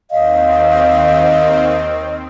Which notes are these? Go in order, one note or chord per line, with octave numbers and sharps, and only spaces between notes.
D#2 D#3 C4 D#5 F5